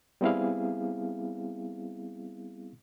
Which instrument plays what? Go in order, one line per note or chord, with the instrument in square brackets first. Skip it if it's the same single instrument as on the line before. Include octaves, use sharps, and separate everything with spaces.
[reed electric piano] G3 B3 C4 E4 G#4 F5